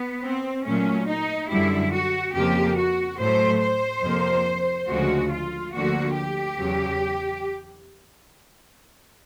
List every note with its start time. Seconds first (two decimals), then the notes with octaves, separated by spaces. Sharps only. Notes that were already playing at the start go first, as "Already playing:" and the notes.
Already playing: B3
0.23 C4
0.65 A#2 F#3 A3 C#4
1.07 D#4
1.49 F#2 D3 G3 E4
1.92 F#4
2.34 F2 C#3 F3 A#3 G4
2.77 F#4
3.18 A2 F#3 A3 C5
3.61 C5
4.03 F2 C3 F3 A#3
4.88 D2 C#3 F3 G#3 F#4
5.31 F4
5.73 D2 D3 F3 A#3 F#4
6.16 G4
6.58 E2 C#3 F#3